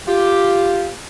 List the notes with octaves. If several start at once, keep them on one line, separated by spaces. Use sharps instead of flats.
F4 G4